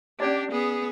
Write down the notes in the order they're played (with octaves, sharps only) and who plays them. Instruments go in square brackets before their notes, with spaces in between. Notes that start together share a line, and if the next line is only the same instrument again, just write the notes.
[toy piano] C#4 D5 D#5 [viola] D4 G4
[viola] B3 G#4